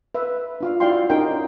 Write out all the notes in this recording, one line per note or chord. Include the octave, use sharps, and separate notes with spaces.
B4 E5 C6
D4 F4 F5
E4 F#4 D5 F5 G5 C6
C#4 D#4 G4 A#4 G5